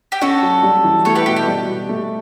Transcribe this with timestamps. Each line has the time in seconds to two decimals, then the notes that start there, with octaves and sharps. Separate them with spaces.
0.12 G4
0.21 C#4 F#4 A4
0.42 F#3
0.63 G3
0.84 E3
1.05 A3 A4 C#5
1.15 G4 B4
1.26 B2 G4
1.36 G4
1.47 G3
1.68 B2
1.89 A3